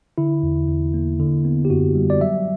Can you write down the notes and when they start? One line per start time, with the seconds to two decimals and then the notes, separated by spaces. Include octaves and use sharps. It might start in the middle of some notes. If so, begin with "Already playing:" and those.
0.18 D3 E4
0.43 E2
0.68 E2
0.94 A#3
1.20 D3
1.45 B3
1.65 G4
1.70 F#2 F#4
1.95 G3
2.10 D5
2.20 F#3 E5